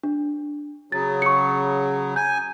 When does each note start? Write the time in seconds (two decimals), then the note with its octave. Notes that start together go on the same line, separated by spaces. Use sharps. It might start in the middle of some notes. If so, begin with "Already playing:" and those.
0.03 D4
0.92 C#3 F#3 A6
1.22 C#6 C#7
2.16 G#5 G6